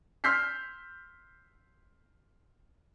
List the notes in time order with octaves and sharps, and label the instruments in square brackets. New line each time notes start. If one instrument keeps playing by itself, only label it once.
[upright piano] C6 E6 F6 G6 B6 C7